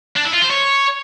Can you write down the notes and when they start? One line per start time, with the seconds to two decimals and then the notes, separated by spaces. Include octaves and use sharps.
0.17 D4
0.25 E4
0.34 F4
0.42 C5
0.51 C#5